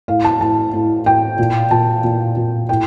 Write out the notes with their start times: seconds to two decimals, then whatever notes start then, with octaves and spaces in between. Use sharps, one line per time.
0.08 A2 F5
0.24 A5
0.41 A2 A5
0.73 A2
1.06 A2 G5
1.39 A#2
1.71 A#2 A5
2.04 A#2
2.36 A#2
2.69 A2 G5